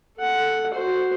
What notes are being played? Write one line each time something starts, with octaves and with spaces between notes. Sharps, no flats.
A4 F#5
F#4 C5